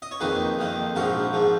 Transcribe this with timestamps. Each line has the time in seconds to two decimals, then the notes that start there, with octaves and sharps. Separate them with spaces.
0.02 D#5
0.11 C#5
0.20 F2 D#3 A#3 G#4 B4
0.59 F2 D#3 A#3
0.95 A#1 G#2 F3 F#4 A#4
1.33 G#2 F3